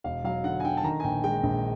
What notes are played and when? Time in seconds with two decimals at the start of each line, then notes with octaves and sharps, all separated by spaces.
0.04 E1 F5
0.24 F#3 F5
0.44 D3 F#5
0.60 G#5
0.64 D3 G5
0.77 A5
0.84 D#3 A#5
1.00 G#5
1.04 A#1 G5
1.24 G#3 G5
1.43 A#1